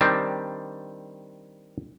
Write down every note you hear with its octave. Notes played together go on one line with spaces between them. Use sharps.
D#3 G3 C4 D4